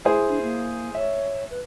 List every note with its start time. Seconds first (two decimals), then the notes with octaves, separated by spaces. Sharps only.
0.05 E4 G#4 C5
0.29 D4
0.42 A#3
0.95 C#5 E5
1.50 B4